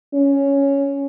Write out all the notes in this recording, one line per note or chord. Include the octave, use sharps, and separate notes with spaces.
C#4